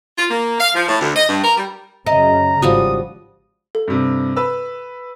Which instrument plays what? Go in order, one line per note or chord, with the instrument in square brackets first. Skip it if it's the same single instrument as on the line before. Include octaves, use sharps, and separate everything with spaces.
[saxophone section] F4
A#3
F5
F3
A2
D2
D#5
G2
A#4
G3
[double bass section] F#2 C#3 [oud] D#5 [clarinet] A#5
[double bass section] G#1 [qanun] F3 G3 F#4 [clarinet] D#6
[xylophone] A4
[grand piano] G2 C3
B4 E6